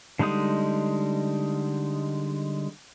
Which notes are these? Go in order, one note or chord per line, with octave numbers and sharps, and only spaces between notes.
D3 G3 G#3 D#4 D#6